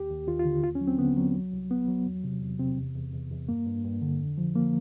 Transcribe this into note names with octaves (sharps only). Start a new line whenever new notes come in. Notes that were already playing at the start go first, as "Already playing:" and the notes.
Already playing: D#2 G4
D#2
D#2 F4
F4
D3
D#2 F4
C#4
F#3
C4
D3 B3
F#3
C2
C2
C2 B3
F#3
E2
C3
E2
C3 C4
E2
E2
E2
E2
G2 A#3
G2
G2
D3
F2
F3
F3 A#3